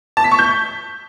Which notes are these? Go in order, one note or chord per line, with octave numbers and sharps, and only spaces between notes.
A5
B6
C#6
G6